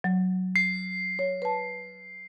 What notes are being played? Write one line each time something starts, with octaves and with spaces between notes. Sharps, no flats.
F#3
C7
C#5
B4 A5